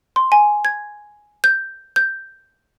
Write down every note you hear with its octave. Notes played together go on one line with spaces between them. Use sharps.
C6
G#5
G#6
G6
G6